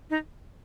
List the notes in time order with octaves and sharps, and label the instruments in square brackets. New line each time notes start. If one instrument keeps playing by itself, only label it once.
[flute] D#4